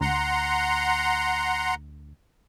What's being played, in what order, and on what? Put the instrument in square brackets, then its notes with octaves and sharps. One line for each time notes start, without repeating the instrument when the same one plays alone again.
[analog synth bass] D2 [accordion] F#5 A#5 C6